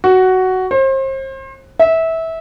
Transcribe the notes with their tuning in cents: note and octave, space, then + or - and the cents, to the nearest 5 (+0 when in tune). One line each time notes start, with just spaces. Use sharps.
F#4 +10
C5 +35
E5 -20